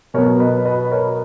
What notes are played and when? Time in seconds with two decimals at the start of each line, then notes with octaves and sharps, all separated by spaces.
0.14 B2 F#3 B3 A#4 C#5
0.40 B4 D#5
0.66 B4 D#5
0.91 A#4 C#5